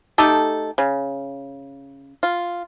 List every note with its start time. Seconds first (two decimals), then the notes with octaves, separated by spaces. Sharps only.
0.18 A3 D#4 G4 A4
0.78 C#3
2.23 F4